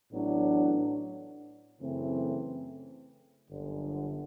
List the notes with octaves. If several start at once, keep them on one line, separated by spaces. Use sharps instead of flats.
A1 A2 F#3 B3 D4
F#2 C#3 E3 A3 C4
G1 F#2 D3